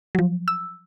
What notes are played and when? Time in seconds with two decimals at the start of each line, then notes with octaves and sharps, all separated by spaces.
0.15 F3 F#3
0.48 E6